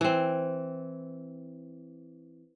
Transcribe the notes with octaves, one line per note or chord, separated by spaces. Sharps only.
E3 C4